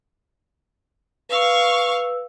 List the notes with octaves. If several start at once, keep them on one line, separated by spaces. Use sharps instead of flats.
B4 F5 C#6 E6